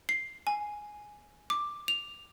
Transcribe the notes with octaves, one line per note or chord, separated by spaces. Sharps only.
C7
G#5
D6
F7